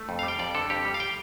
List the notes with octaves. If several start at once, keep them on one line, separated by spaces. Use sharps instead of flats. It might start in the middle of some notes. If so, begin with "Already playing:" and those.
Already playing: A3
F2
F5
G3
G5
F2 D5
D3 A4
F2 G4
G3
F5
G5